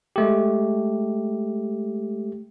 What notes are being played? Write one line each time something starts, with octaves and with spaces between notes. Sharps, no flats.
G#3 A3 G4